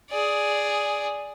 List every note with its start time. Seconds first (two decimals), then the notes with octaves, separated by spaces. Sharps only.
0.11 G#4 D5